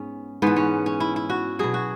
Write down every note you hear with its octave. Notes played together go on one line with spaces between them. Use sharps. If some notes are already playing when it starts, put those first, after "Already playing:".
Already playing: G#2 B3 C#4
G#2 E3 B3
C#4
C#4
E4
E4
F#4
B2 F#3 G#4
F#4